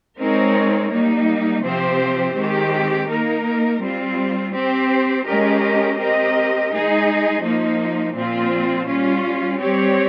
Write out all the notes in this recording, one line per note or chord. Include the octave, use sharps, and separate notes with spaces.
G#3 C4 D#4 A#4 C#5
G3 A#3 D#4
C3 F3 C4 G4 C5
D#3 G#3 C4 G4
A#3 D#4 A#4
G3 C4 F4
C4 G4 C5
G#3 C#4 G4 A#4 D#5
C4 G4 A#4 D#5
G#3 D#4 G#4 D#5
F3 A#3 D#4
A#2 F3 C4 F4
G3 C#4 F4
G3 C4 G4 C#5